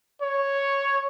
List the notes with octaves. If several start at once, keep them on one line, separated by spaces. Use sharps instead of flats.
C#5